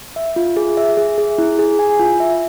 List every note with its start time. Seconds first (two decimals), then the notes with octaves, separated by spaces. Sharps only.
0.16 E5
0.36 F4
0.57 G#4
0.77 E5
0.97 G#4
1.18 G#4
1.38 E4
1.59 G#4
1.79 G#5
1.99 F4
2.20 E5